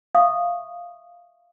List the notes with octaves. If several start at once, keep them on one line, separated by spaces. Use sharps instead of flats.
E5 F5 C#6 D#6